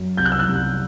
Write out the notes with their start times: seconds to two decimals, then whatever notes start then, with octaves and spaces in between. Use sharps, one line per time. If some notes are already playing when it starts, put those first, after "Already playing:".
Already playing: F#2
0.17 C2 G6
0.25 F#6
0.32 E6
0.39 F#6
0.48 C2